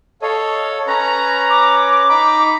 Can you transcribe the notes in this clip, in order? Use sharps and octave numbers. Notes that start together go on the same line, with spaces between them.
A4 C#5 D#5 F5
C#4 B4 C#5 A#5
D6
D#4 A#5 B5